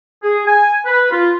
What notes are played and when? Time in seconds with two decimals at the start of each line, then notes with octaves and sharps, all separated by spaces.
0.23 G#4
0.46 G#5
0.85 B4
1.10 F4